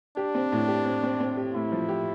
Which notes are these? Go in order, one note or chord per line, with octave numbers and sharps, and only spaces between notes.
D4 G4
C4
A2
G4
C4
C4
C4
G4
A2 E4
F3
G4